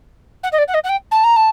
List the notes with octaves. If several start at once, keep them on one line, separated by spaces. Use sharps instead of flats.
F#5
D#5
D5
F#5
D#5
F#5
G5
A5
A#5
A5